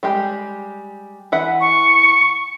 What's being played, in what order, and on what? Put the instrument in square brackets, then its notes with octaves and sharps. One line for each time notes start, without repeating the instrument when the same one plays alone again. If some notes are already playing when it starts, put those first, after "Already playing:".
[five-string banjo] G3 G#3 G4
E3 E5 F#5
[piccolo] C#6